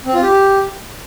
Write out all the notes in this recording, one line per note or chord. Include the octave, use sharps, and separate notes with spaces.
C4
F4
G4